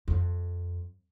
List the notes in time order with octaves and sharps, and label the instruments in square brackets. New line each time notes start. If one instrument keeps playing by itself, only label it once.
[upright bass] F2